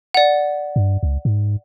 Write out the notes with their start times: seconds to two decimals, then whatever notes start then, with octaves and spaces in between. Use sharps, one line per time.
0.14 D5 F#5
0.76 G2
1.03 C#2
1.25 G#2